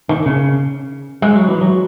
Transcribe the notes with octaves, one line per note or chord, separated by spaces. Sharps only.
D#3
C#3
G#3
F#3
E3
F#3